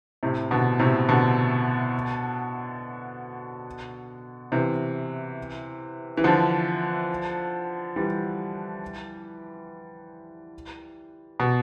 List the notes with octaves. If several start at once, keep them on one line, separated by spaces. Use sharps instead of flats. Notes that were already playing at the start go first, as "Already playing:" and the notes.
A2 C3
B2 D3
A2 C3
B2 D3
C3 E3
E3
D3 F3
E3 G3
B2